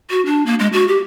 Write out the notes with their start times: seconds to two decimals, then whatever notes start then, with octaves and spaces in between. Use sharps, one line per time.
0.10 F#4
0.26 D4
0.46 A#3
0.59 G#3
0.73 F#4
0.88 G4